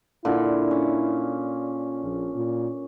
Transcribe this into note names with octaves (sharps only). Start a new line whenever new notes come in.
A#2 D3 E4
C#4
A#1
A#2